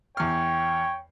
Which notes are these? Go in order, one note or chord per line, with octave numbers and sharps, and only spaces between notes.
E2 C#5 G5 F6